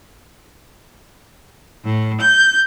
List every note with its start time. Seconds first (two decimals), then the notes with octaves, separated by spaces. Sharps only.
1.84 A2
2.21 G6